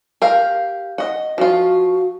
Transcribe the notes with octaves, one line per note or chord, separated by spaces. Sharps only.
G4 A#4 F5
D#5 F#5
F3 F4 F#4